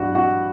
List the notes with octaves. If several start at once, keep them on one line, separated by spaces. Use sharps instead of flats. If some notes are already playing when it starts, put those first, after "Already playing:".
Already playing: G2 F#3 F#4 F#5
F#4 F#5